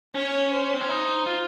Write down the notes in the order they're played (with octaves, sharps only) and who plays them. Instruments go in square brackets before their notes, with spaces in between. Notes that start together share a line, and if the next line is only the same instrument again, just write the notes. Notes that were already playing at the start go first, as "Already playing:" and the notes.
[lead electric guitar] C#4 [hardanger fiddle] C#5
[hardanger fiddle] C5
[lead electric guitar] C4
C#4
D#4
F4